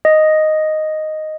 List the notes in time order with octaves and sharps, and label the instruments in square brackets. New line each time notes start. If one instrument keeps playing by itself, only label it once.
[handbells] D#5